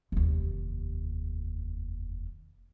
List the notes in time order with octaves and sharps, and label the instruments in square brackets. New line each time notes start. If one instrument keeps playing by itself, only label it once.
[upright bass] F1 D#2